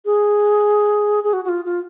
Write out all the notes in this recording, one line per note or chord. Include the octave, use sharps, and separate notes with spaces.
G#4
G#4
F#4
F#4
F4
F4